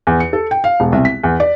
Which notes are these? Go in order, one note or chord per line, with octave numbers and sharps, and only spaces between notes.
E2
C#7
A4
G5
F5
E1
C2
B6
E2
D5